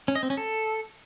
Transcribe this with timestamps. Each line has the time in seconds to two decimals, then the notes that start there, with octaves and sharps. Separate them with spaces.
0.08 C#4
0.15 D#5
0.23 C4
0.30 C#4
0.37 A4